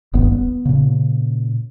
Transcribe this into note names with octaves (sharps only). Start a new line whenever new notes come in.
D#1 G#1 G2 B3
B3
A#2 C#3